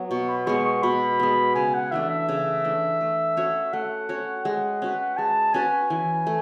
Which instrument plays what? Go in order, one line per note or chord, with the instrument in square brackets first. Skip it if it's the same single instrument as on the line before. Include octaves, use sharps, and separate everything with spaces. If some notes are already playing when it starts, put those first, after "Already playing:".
Already playing: [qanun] F#3 B3
[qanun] B2 [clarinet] C#6
[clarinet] B5
[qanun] G#3 B3 [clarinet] C#6
[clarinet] C#6
[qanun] B2 [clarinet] B5
[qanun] G#3 B3
[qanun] C#3 [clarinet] G#5
[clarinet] F#5
[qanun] E3 A3 D4 [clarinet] E5
[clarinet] E5
[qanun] C#3
E3 A3 D4
A3
C#4 F#4 C#5
[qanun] A3 [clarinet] F#5
[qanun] C#4 F#4 C#5
[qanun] G#3 [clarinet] F#5
[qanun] C#4 F#4 B4
[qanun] G#3 [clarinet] A5
[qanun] C#4 F#4 B4 [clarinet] G#5
[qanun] E3
A3